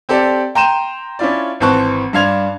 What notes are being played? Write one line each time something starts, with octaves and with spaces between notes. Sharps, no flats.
C4 G4 A4 D5
G5 A#5 C6 G6 D#7 E7
C#4 D4 E4 F4 D5
G#1 E3 C4 A5 C#6 F#6
G2 D4 F5 C6 G#6 F7